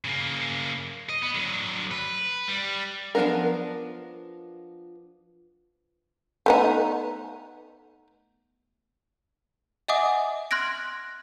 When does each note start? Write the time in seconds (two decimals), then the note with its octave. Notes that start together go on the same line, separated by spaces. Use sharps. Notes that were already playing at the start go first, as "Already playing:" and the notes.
0.05 C#3 A#3
1.09 D#5
1.23 B3
1.35 D3 F#3
1.91 B4
2.48 G3
3.15 F3 G#3 B3 D4 A#4
6.46 A3 B3 D#4
9.88 D#5 E5 F#5 G#5 D6 D#6
10.51 C6 F6 F#6 G#6 A#6 D7